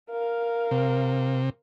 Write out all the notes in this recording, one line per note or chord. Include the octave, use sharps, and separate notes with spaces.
A#4 F5
C3